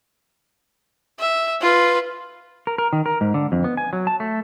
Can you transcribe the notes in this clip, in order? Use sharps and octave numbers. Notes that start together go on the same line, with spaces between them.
E5
F4 B4
A#4
A#4
D#3
A#4
G#2
D3
F2
B3
G#5
F#3
A5
A3